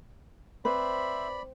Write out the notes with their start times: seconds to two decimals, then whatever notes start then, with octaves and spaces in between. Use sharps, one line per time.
0.65 C4 B4 C5 D5 E5 B5